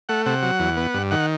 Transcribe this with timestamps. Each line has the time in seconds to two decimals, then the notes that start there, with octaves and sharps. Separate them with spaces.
0.09 A3 F#5
0.26 C3 F#5
0.43 F#3
0.60 E2
0.77 B3
0.94 G2
1.11 D#3 F#5